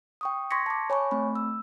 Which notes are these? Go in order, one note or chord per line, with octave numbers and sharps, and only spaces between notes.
G5 C#6 D#6
C6 C#6 G#6 A#6 B6 C#7
A5 D6
C#5 G#5 B5 C#6
A3 C4 B5
E6